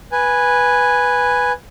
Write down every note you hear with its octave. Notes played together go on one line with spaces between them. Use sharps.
B4 G#5